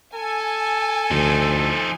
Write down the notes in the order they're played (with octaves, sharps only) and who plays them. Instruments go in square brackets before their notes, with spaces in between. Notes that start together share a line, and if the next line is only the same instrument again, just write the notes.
[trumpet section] A4 [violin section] G#5
[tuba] D2 [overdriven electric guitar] F3 D#4